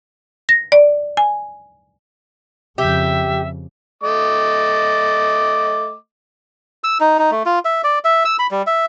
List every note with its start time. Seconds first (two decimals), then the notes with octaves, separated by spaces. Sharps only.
0.49 A#6
0.72 D5
1.17 G#5
2.78 F2 C#3 G4 E5
4.03 A3 D#5 D6
6.84 E6
7.00 D#4
7.19 D#4
7.31 A3
7.46 F4
7.65 E5
7.84 D5
8.05 E5
8.25 E6
8.39 B5
8.51 G3
8.67 E5